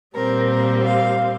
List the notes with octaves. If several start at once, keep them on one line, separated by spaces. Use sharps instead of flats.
A#2 G3 C4 A#4
A#4
F5